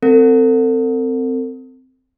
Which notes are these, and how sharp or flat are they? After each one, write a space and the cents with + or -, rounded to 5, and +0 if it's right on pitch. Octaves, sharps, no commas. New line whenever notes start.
C4 -15 A4 +40